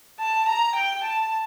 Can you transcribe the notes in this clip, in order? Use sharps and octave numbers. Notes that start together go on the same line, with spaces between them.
A5
A#5
G5
A5